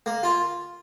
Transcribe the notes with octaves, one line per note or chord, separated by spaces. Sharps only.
A#3
F4